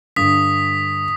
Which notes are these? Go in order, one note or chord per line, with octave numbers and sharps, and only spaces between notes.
G2 D3 D#6 B6